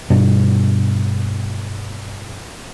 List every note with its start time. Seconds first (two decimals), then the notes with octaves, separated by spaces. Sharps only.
0.10 G2 B2 G3